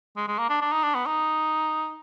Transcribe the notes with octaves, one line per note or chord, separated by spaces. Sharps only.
G#3
G#3
A#3
D4
D4
D#4
D4
B3
D#4